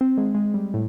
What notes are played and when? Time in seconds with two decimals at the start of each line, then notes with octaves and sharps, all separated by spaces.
0.01 C4
0.18 G#3
0.35 G#3
0.54 G3
0.74 A2